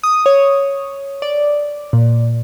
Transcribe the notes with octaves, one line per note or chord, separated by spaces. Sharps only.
D#6
C#5
D5
A#2